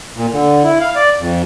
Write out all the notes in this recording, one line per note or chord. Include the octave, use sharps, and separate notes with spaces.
A#2
D3
E4
F5
D5
F2